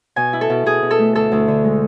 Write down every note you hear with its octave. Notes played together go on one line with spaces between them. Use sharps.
B2 G#5
E4
A4
B2
B2 G#4
B2
A4
A3
D2 A4
D2
D3
G#3